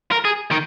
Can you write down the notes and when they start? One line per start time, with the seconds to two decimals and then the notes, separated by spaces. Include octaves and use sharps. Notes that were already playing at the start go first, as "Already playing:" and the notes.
0.12 A#4
0.25 G#4
0.51 D#3